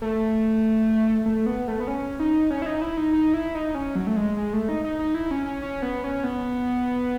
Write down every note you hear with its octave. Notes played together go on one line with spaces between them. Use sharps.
A3
A3
B3
A3
B3
C#4
D#4
C#4
E4
D#4
E4
D#4
D#4
E4
D#4
C#4
F#3
A3
G#3
G#3
A3
D#4
D#4
D#4
E4
C#4
C#4
C#4
B3
C#4
B3